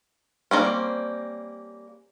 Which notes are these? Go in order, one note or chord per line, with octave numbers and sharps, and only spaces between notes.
G3 A#3 C4 C#4